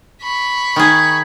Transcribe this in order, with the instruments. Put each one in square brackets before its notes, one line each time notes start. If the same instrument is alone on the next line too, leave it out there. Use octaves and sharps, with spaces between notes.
[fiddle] B5 C#6
[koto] D#3 G#4